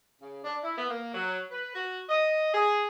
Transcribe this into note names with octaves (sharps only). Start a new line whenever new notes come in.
C#3
D4
E4
B3
A#3
F#3
B4
F#4
D#5
G#4